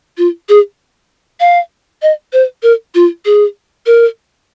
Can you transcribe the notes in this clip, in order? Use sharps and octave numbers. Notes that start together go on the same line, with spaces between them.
F4
G#4
F5
D#5
C5
A#4
F4
G#4
A#4